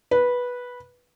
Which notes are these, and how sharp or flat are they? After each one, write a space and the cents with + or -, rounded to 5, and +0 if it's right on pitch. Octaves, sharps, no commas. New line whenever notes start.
B4 -10